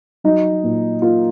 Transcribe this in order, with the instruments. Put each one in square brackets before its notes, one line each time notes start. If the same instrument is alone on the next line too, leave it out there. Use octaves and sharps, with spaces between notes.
[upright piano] F#3 D#4
A#2
A#3 F4